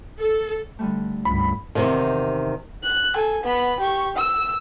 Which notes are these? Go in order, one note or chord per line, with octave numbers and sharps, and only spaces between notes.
A4
D3 G3 A3
C#2 G2 B5
E2 C3 D#3
F#6
A4 G#5
B3 B5
G4 C#6
E6